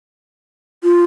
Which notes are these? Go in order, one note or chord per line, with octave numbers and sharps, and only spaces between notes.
F4